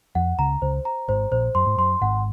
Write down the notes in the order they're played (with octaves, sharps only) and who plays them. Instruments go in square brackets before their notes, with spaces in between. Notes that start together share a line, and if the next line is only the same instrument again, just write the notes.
[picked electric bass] F2 F3 [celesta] F#5
[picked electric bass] C#2 C#3 [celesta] A#5
[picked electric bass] C#2 C#3 [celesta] C5
[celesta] A#5
[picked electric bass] G#1 G#2 [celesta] C5
[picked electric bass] A#1 A#2 [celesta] C5
[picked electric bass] F#2 [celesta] C6
[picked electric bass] G#2
[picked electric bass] F#2 [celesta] C6
[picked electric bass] G#1 G#2 [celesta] F#5